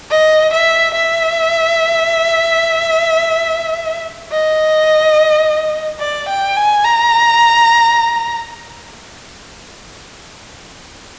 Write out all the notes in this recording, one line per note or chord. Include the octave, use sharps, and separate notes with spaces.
D#5
E5
E5
D#5
D5
G5
G#5
A#5